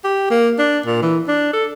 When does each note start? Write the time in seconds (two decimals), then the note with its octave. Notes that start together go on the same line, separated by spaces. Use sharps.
0.04 G4
0.31 A#3
0.59 D4
0.86 A#2
1.03 E3
1.28 D4
1.53 A4